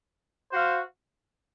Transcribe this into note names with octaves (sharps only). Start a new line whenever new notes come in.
F#4 C5 F5